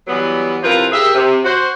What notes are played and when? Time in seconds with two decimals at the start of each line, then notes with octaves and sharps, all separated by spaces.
0.08 E3 F#3 G3 B3
0.63 C3 F3 E4 F4 A#4 B4
0.92 G4 G#4 A#4 E5
1.15 C3
1.45 F#4 C5